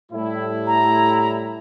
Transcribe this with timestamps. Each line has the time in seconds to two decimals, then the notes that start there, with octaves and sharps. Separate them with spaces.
0.11 A2 G3 E4
0.67 A#5